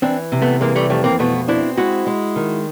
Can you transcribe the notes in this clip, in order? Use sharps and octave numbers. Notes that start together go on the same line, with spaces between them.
E3 C4 D4
C3
A3 B3
E3 G#3 A#3
G3 A3
F2 G3 A3
A#3 C4
B2 A3 B3
C4 D4 E4
G#3 E4 F#4
G#3
D#3